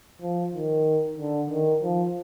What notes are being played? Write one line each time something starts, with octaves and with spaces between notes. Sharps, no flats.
F3
D#3
D3
D#3
F3